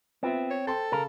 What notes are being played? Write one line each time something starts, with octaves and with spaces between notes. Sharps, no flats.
B3 C4 F4 E5
C#5
A4 C5 G5 C6
C#3 A#4